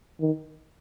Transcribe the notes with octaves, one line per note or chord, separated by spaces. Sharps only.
D#3